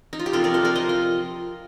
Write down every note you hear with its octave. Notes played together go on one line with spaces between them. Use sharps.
D#4
F4
G4
C3 F3 A#3 D4 F4 A4
A#4 D5
A4 C5
A#4 D5
C5 D#5
F4